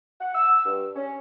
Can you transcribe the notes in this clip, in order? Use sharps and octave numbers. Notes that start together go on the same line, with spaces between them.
F#5
E6
G2
C#4